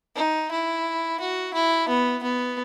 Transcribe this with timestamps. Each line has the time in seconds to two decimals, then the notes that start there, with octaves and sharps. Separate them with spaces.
0.15 D#4
0.51 E4
1.20 F#4
1.54 E4
1.89 B3
2.23 B3